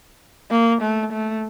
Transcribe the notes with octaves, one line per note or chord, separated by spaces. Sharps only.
A#3
A3
A3